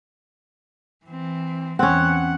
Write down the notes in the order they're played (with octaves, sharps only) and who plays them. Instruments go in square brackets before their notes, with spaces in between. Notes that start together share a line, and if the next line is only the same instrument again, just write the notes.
[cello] E3 C4
[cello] E2 E3 [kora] C4 C#4 [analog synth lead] F#5